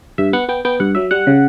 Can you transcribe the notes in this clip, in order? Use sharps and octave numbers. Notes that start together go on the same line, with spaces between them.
G2 E5
B3 F#5
B3 G5
B3 G5
G2 F#5
F#3 E5
G3 F#5
C#3